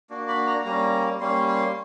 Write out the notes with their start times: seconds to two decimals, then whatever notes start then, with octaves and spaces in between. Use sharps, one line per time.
0.10 A#3 D4 F#4
0.28 B5
0.47 A#5
0.65 G3 A#3 C#4 A#5
1.20 G3 A#3 C#4 C6
1.48 C6